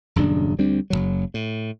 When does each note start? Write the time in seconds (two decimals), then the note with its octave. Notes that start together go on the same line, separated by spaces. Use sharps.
0.16 D#1 F#2 C#3 D4
0.59 D2 G3 C4 D4
0.90 F#1 C#2 F#3
1.34 A2